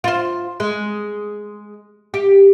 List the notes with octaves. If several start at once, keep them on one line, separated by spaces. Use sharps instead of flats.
F4 C5
G#3
G4